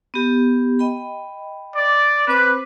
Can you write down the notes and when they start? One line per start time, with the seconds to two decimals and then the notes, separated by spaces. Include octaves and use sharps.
0.14 B3 G4
0.79 D#5 G5 B5
1.76 D5
2.28 C4 B4 C5 D6